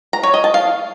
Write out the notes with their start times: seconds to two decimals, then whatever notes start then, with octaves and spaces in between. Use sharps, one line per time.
0.13 A#5
0.23 C#5
0.34 D#5
0.44 A5
0.54 F5